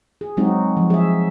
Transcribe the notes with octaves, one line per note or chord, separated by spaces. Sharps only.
G#4
F#3 G#3 C4 D#4 F#4
F3
G#4 E5